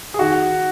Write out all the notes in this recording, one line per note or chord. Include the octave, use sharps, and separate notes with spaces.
G#4
D#3 F#4